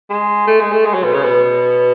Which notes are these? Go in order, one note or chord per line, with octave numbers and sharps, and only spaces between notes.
G#3
A3
G#3
A3
G#3
F#3
B2
C#3
B2